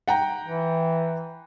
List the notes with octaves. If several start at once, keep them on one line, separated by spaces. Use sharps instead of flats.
F#5 G5 A#5
E3